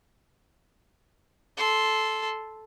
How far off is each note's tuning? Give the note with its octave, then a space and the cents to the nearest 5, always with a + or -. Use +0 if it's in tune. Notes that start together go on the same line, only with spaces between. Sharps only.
A4 -10 C6 +0